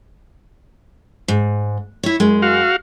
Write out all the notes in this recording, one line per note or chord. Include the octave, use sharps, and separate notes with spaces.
G#2
E4 C#5
F#2 G#3
F#4 F5